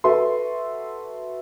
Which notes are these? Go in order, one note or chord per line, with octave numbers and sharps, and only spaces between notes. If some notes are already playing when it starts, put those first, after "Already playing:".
F#4 A4 B4 E5 C6